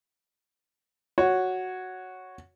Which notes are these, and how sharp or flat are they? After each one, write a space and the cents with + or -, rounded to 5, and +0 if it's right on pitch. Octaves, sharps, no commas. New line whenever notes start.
F#4 +0 C#5 +0